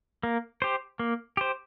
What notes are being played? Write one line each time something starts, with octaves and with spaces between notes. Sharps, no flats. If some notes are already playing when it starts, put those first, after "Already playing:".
A#3
G4 C5
A#3
G4 C5